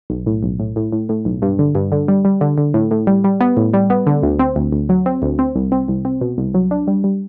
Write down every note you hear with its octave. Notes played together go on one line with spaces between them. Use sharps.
B1
A2
B1
A2
A2
A2
A2
B1
G2
D3
G2
D3
G3
G3
D3
D3
A2
A2
G3
G3
B3
A2
G3
B3
D3
D2
C4
D2
D2
F#3
C4
D2
C4
C2
C4
C2
C4
B2
C2
F#3
D4
G3
G3